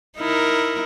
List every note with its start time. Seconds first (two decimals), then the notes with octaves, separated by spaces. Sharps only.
0.18 D#4 E4 A#4